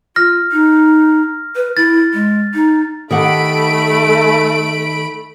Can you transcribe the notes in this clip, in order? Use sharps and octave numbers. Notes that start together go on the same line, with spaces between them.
F4 F6 A#6
D#4
B4
E4 A6
G#3
D#4
D#3 A3 G4 A4 F#5 B5 D7